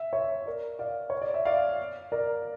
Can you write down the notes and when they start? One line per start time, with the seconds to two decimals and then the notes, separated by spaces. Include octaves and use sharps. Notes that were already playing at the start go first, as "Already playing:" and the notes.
Already playing: E5
0.13 C#5 E5
0.46 A#4 D5
0.79 D5 F5
1.10 C#5
1.22 D5
1.34 E5
1.45 D5 F5
2.12 A#4 D5